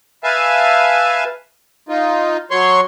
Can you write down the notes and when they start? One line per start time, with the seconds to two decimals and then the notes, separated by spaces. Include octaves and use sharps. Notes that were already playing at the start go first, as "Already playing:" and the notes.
0.24 B4 E5 F5 G#5 A5
1.89 D#4 F4
2.51 F#3 C#5 C6 C#6